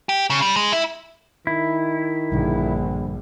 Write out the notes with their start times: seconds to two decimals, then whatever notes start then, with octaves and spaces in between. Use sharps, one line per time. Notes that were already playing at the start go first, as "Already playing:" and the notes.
0.09 G4
0.30 C#3
0.42 G3
0.56 G#3
0.72 E4
1.47 D#3 E4
2.32 A#1 G2 D3